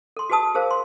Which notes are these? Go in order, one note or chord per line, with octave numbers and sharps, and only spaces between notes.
A4 C6
F#4 G#4 B4 A5 D#6
G#4 A#4 C5 F5
C6